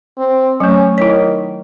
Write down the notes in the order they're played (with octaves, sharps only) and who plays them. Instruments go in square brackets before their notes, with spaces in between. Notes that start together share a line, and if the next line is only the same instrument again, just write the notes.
[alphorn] C4
[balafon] F#3 A3 [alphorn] C#4
[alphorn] D#3 [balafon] E4 C#5